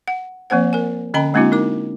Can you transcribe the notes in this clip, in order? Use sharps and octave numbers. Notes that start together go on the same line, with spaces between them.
F#5
F3 A#3 C4 C5 F#5
A#4 G#5
D3 C#4 D#5 G5 A#5 B5
G#3 A#3 C4 D4 E4 F#4
D#4 A#4 D6